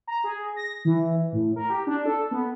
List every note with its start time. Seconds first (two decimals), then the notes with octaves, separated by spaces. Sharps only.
0.07 A#5
0.24 G#4
0.56 A#6
0.85 E3
1.32 A2
1.56 A#4
1.70 G4
1.87 D4
2.06 A4
2.31 B3